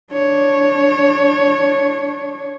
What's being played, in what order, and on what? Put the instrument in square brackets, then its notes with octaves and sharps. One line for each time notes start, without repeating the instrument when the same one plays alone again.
[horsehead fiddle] D4 C#5